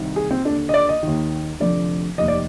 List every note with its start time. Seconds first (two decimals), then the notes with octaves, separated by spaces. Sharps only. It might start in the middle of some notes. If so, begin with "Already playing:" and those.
Already playing: C2 C3 D#3
0.16 G#4
0.31 C4
0.45 D#2 D3 D4
0.69 D#5
0.74 D5
0.89 D#5
1.03 D#2 D#3
1.60 F1 F2 D3 D5
2.18 F1 D#2 D#3 D#5
2.28 D5